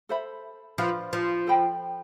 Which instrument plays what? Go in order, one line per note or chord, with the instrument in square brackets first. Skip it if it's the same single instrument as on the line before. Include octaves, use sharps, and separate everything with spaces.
[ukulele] A4 C5 E5 B5
[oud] F3 [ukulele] D4 F4 B4
[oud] F3
[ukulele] A4 C5 G5 B5